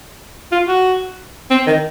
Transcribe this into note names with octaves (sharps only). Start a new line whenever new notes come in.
F4
F#4
C4
D#3